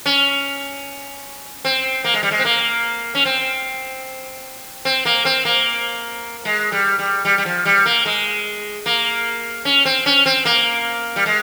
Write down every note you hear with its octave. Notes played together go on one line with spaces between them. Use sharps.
C#4
C4
A#3
G#3
G3
G#3
C4
A#3
C#4
C4
C4
A#3
C4
A#3
G#3
G3
G3
G3
G3
F3
G3
A#3
G#3
A#3
C#4
C4
C#4
C4
A#3
G3
G#3